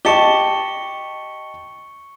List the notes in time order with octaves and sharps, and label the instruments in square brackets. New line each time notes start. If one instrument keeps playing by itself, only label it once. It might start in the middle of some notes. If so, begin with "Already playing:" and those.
[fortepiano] G4 D#5 A5 [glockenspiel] C#6 C#7 G7